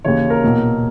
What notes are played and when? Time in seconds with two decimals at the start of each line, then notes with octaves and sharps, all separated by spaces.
0.05 D#2 C#3 E3 C#5
0.30 A#4
0.44 B1 A#2